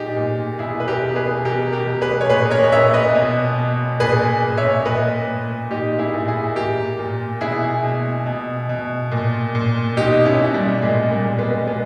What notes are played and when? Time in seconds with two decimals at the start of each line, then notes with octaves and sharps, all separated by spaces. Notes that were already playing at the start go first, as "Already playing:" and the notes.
Already playing: A#2 D#4 G4 G#4
0.16 A#2
0.59 B2 E4 G#4
0.80 B4
0.88 G4 A#4
1.03 B2
1.16 G#4 B4
1.45 B2 G4 A#4
1.72 G4 A#4
1.87 B2
2.01 G#4 B4
2.21 C#5
2.30 A#2 G#4 B4
2.51 A#4 C#5
2.63 D#5
2.72 A#2 C#5 E5
2.93 B4 D#5
3.15 B2
3.58 B2
4.00 A#2 G#4 B4
4.43 A#2
4.57 C#5 E5
4.85 A#2 B4 D#5
5.28 A#2
5.70 A#2 D#4 G4
5.99 E4 G#4
6.13 A#2
6.28 E4 G#4
6.55 A#2 G4 A#4
6.99 A#2
7.41 B2 E4 G#4
7.84 B2
8.26 B2
8.69 B2
9.11 A#2
9.55 A#2
9.97 B2 D#4 G4
10.25 C#4 E4
10.40 B2
10.54 G3
10.82 A#2 G#3
11.11 G3 A#3
11.25 A#2
11.39 G#3 B3
11.67 B2 G#3 B3